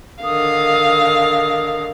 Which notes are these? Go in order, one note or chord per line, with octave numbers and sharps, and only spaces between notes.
D3 D#3 F5 D#6